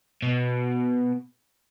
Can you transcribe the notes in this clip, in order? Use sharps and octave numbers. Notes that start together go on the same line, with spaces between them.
B2